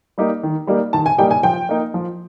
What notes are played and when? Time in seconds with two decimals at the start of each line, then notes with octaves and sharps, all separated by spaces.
0.18 G3 A#3 D#4 G4
0.43 D#3
0.67 G3 A#3 D#4 G4
0.93 D#3 A5
1.06 G#5
1.18 G3 A#3 D#4 G4 G5
1.31 G#5
1.43 F3 G5
1.69 A#3 D#4
1.94 F3